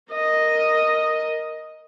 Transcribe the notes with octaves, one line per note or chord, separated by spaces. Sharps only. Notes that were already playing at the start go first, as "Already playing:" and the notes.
A#4 D#5